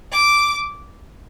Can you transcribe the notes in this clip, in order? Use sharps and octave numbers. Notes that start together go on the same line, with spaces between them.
D6